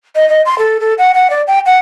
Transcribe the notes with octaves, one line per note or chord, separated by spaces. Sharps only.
D#5
D#5
C6
A4
A4
F#5
F#5
D5
G5
F#5